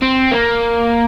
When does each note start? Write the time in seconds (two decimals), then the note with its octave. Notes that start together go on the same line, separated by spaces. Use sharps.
0.02 C4
0.31 A#3